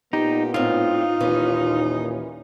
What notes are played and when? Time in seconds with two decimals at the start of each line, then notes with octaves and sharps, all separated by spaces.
0.13 A#2 B3 D#4 G4
0.54 A2 C4 D#4 F4
1.20 D#2 A#2 E3 C#4